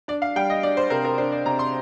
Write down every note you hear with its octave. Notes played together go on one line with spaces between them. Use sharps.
D4 D5
F5
G3 G5
D#5
D4 D5
C5
C3 A#4
A#4
D4 C5
D5
C3 A#5
C6